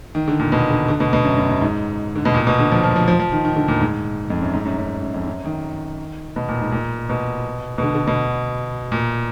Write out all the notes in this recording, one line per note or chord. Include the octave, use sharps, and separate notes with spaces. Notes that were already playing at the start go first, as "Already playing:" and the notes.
D#3
D3
A#2
B2
D3
D3
B2
B2
F#2
F#2
F#2
G#2
D3
B2
A#2
B2
D3
F3
F3
F3
F3
F3
D#3
D#3
D3
A#2
G#2
F2
F#2
G#2
F#2
F#2
F#2
F2
F#2
D#3
B2
A#2
G#2
A#2
B2
B2
D3
D3
B2
A#2